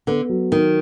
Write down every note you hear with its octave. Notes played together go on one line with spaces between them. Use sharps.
D3 B3
F#3
D#3 D#4